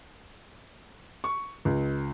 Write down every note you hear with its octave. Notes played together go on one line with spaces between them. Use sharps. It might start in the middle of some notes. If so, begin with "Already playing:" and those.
C#6
C#2